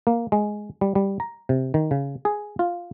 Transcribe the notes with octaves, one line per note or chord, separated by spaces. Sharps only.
A#3
G#3
G3
G3
A#5
C3
D#3
C#3
G#4
F4